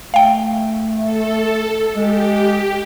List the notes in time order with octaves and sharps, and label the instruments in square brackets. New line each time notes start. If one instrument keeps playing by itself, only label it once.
[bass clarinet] A3 [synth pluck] F5 G5
[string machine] A4
[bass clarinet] G#3 [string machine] G4